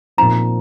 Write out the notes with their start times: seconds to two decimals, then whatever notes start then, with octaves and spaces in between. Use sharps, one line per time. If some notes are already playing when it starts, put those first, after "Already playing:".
0.17 A#2 F3 C4 D#4 A#5